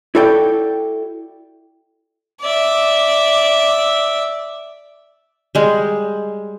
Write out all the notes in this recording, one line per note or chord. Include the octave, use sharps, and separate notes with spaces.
E4 F#4 A4 D5 G5
D5 E5
G3 G#3